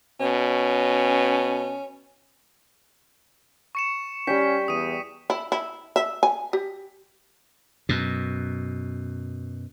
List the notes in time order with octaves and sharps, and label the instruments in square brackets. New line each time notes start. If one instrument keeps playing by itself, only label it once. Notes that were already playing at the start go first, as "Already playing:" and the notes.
[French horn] B2 [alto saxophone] C#4
[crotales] C#6 C#7 E7
[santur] G3 G5 [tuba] C#4 [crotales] B6
[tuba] E2 [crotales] D#6 D#7
[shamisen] E4
E4
E5
G#5
G4
[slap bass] F#2 B2